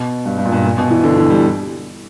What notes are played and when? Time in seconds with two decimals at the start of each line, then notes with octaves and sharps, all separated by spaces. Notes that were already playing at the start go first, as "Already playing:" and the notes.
Already playing: B2
0.25 G2
0.38 G2
0.46 A#2
0.52 G2
0.64 A#2
0.78 B2
0.90 E3
1.03 D3
1.18 E3
1.30 G3